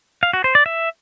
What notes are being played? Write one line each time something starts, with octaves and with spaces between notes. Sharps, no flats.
F5
F#4
C5
D5
E5